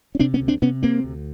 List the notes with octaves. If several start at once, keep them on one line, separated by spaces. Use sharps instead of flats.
C#4
C3 C4 D4
B3 C#4
D2
C4 D4
C3 B3 C#4
C3 A#3 C4
D2